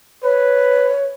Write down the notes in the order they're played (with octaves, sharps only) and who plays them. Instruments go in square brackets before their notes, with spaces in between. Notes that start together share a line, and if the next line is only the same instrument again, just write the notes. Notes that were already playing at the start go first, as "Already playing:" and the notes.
[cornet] B4 [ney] C#5